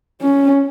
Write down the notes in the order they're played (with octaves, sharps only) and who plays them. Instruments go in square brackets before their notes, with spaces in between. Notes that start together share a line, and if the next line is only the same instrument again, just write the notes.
[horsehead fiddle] C#4